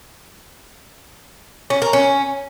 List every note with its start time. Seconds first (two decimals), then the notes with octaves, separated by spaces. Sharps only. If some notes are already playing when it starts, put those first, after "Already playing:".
1.70 C#4
1.82 A#4
1.93 C#4